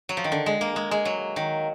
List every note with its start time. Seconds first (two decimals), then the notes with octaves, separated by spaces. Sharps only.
0.09 F#3
0.17 F3
0.24 D#3
0.32 D3
0.46 G#3
0.61 A#3
0.76 G#3
0.91 G#3
1.05 F#3
1.36 D#3